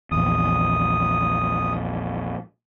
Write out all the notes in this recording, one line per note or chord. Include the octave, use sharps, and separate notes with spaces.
A#1 E2 D#6